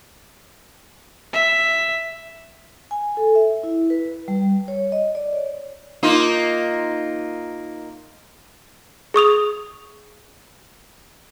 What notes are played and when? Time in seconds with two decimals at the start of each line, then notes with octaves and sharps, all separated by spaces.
1.33 E5
2.91 G#5
3.17 A4
3.35 E5
3.63 E4
3.90 B4
4.13 B4
4.28 G3
4.68 C#5
4.92 D#5
5.15 D5
5.33 C#5
6.03 A#3 D#4 F4
9.14 G#4 C#6 D#6 F7